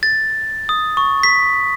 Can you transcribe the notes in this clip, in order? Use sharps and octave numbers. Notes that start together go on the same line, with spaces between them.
A6
D#6
C#6
B6